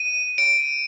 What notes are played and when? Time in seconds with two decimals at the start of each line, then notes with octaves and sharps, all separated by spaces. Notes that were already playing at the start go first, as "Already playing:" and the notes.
Already playing: D#7
0.38 D7